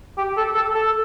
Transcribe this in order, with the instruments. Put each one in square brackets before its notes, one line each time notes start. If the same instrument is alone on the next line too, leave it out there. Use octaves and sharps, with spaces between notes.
[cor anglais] G4
A4
A4
A4